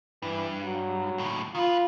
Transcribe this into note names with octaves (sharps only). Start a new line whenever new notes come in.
G2 E3
F#3
D#2 A2
D#3 F4 B4